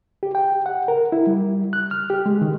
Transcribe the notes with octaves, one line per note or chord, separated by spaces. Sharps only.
G4
G5
F#5
A#4
E4
G3
F#6
F6
G4
G#3
D#3